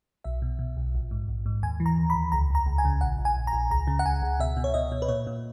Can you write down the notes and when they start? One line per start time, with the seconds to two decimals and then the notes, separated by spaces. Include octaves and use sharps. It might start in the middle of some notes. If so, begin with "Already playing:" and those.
0.24 B1 E5
0.42 B2
0.59 B2
0.77 B1
0.95 A#1
1.11 G#2
1.28 A#1
1.46 G#2
1.63 D#2 G#5
1.80 E3
1.86 A#5
1.98 D#2
2.10 B5
2.15 D#2
2.32 C#2 A#5
2.50 C#2 A#5
2.66 C#2
2.78 G#5
2.85 C#3
3.01 A#1 F#5
3.18 A#1
3.25 G#5
3.37 A#1
3.47 A#5
3.53 A#1
3.71 C#2 A#5
3.87 C#3
3.99 F#5
4.05 C#2 G#5
4.22 C#2
4.40 B2 E5
4.57 B2
4.64 C#5
4.74 B2 D#5
4.92 B2
5.02 B4
5.08 A#2 C#5
5.27 A#2